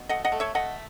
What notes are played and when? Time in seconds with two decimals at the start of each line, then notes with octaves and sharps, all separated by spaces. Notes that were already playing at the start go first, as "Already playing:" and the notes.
Already playing: B2
0.09 A3 D#5 F#5
0.25 D#5 F#5
0.32 A3
0.40 C#5 E5
0.55 A3 D#5 F#5